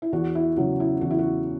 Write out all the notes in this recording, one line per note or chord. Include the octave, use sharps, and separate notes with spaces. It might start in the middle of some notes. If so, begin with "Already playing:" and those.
E4
E2 F#4
E4
C#3 F#3 C#4 F#4
E4
E2 F#4
E4
F#4